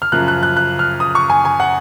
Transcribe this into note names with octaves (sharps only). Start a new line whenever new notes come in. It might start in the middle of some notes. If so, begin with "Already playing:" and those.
F6
F#2 C#3 F3 F#6
F#6
F#6
F#6
F6
D#6
C#6
G#5
G#5
F#5